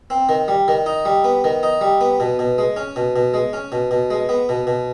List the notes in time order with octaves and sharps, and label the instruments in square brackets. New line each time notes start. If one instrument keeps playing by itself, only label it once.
[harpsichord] C4
D#3
G3
D#3
D#4
G3
B3
D#3
D#4
G3
B3
B2
B2
G#3
C#4
B2
B2
G#3
C#4
B2
B2
G#3
B3
B2
B2